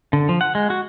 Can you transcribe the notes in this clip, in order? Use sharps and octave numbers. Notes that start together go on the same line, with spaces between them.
D3
F3
F#5
G#3
F#4